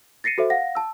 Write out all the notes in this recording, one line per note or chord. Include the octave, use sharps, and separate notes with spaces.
A6 A#6 C7 C#7 D#7
F#4 A4 C5 E5
F5 F#5 A#6
A5 E6